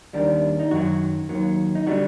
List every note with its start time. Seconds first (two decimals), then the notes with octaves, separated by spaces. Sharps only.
0.13 D#2 D#3 G3 D4
0.59 D#4
0.71 F#2 D#3 F#3 F#4
1.29 D#2 D#3 F#3
1.75 D#4
1.87 D3 G3 F#4